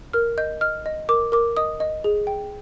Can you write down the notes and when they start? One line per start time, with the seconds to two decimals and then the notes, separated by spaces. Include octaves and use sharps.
0.13 A#4 F6
0.38 D#5 G6
0.61 D#5 F6
0.86 D#5
1.09 A#4 D6
1.32 A#4 D6
1.57 D#5 D#6
1.80 D#5
2.04 G#4
2.27 G5